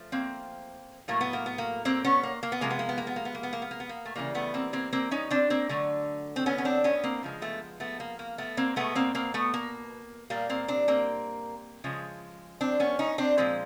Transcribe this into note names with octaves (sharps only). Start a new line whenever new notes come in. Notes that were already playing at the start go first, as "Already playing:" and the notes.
Already playing: F3 A3
A#3 C4
A2 F#3 A3 A#3
B3
A#3
B3
A#3
A#3 C4
B3 C#4
A#3
A#3
B3
C3 F3 G#3 A#3
B3
A#3
B3
A#3
B3
A#3
B3
A#3
B3
A#3
B3
A#3
B3
A#3
A3
C#3 E3 G3 A#3
A3 B3
A#3 C4
A#3 C4
A#3 C4
C#4 D#4
C4 D4
A#3 C4
D3 F#3 A3
C4
B3 C#4
C#4
C4 D4
B3 C#4
A#3 C4
C#3 F3 G#3
A3 B3
A3 B3
A#3
A#3
A3 B3
A#3 C4
B2 G#3 A3 B3
A#3 C4
A#3 C4
A3 B3
A#3
A#2 G3 A#3
A#3 C4
C4 D4
A#3 C4
C#3 F3 G#3
C4 D4
B3 C#4
C#4 D#4
C4 D4
A#2 F3 G#3 C4